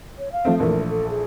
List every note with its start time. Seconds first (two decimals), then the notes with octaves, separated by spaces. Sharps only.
0.18 C#5
0.32 F5
0.45 F3 A3 C4
0.60 A#1 E3 A3 A#4
0.89 A4
1.09 G#4